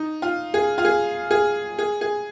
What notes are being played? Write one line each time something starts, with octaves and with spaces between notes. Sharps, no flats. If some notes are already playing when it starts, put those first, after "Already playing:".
Already playing: D#4
F4
G#4
F4
G#4
G#4
G#4
G#4